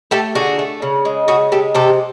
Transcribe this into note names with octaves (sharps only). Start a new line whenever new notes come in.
A3 G4 A4
D3 F#4 G#4
A3
C#3
G#3
C#3 F#4 G#4
G#3 G4 A4
C3 G4 A4